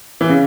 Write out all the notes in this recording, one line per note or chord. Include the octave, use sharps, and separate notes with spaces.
E3
C#3